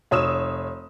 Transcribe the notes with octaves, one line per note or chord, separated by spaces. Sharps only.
F1 C#5 D#6 E6 E7